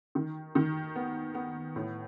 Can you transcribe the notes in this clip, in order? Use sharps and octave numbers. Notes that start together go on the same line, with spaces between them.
D#3
D#3
B3
B3
A2